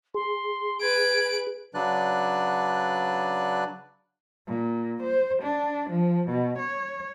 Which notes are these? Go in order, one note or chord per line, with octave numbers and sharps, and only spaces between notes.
G#4 C6
B4 G#6 D7
C#3 F#3 D4 B4 D5 F#6
A#2
C5
D4
F3
B2
C#5